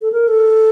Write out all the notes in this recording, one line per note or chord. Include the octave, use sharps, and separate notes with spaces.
A4
A#4
A4